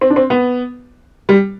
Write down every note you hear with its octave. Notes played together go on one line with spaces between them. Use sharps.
C4
D4
C4
B3
G3